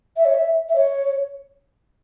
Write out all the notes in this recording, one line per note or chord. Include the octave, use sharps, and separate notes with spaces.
E5
C#5
E5
E5
C#5